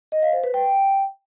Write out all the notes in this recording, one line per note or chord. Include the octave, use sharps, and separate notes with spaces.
D#5
F5
C5
B4
G5